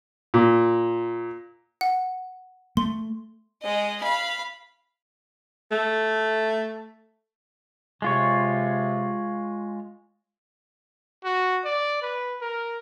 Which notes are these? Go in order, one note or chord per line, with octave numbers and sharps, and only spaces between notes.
A#2
F#5
A3 C6
G#3 D#5
F5 B5
A3
C3 G#3 F4 C#5
F#4
D5
B4
A#4